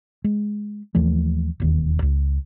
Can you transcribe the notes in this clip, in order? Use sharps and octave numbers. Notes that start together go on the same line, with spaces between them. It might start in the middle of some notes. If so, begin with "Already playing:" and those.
G#3
D#2 E3 F3 A3
E1 D#2 D#3
C#2